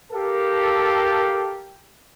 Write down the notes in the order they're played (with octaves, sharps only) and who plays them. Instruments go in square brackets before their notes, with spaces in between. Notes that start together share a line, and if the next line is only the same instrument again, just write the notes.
[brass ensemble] G4 A4 A#4 F5